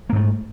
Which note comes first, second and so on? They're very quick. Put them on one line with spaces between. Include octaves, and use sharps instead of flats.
A#3 G#2 A3